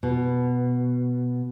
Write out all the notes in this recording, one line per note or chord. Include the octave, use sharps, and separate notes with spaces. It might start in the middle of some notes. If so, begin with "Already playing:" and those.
B2